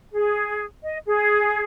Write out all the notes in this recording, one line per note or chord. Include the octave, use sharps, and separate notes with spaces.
G#4
D#5
G#4